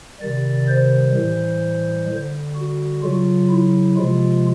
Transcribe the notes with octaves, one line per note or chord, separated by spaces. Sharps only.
C3 D#3 G3 D5
C5
A2 E3 G3
D3 G3
F#4
C#3 F#3 F4
E4
C3 F3 G#3 F4